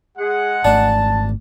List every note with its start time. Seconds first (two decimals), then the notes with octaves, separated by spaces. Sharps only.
0.17 G#3 G#4 F#5
0.65 G#1 A3 D4 A5